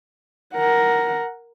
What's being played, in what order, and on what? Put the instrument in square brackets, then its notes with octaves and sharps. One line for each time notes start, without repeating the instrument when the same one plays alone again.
[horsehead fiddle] A#4 F#5